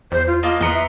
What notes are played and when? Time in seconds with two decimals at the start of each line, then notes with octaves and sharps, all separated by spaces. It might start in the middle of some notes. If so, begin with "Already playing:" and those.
0.12 E2 C5
0.27 F4
0.43 A#3 F4 D#5 A5
0.61 E2 B4 A#5 C6 D#6 C#7
0.73 E5